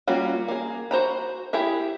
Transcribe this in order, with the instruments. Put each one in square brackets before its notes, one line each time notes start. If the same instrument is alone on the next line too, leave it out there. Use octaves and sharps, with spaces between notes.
[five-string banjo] G3 A#3 C#4 F4 F#4
A#3 G#4
F#4 C5 A#5 B5
E4 G4 G#4 E5